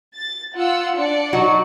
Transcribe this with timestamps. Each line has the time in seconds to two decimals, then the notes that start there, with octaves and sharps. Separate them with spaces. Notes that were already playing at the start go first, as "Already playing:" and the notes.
0.15 A6
0.55 F4 F#5 E6
0.96 D4 D5 C#7
1.33 F#3 D#4 F#4